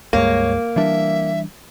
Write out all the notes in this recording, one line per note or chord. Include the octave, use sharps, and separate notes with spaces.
C#2 G2 G#3 A#3 C#5
E3 G3 D4 E5